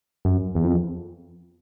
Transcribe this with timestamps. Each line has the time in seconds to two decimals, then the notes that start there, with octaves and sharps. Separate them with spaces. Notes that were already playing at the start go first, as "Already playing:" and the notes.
0.25 F#2
0.55 E2
0.64 F2